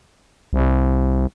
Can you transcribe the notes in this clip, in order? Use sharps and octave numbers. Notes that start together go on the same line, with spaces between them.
C2